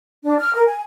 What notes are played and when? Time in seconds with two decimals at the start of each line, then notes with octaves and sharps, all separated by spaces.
0.24 D4
0.38 F6
0.55 A#4
0.67 G#5